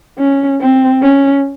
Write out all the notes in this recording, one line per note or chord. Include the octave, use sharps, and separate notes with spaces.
C#4
C4
C#4